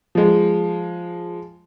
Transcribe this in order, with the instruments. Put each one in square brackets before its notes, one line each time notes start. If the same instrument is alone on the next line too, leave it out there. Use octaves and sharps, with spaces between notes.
[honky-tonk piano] F3 G#3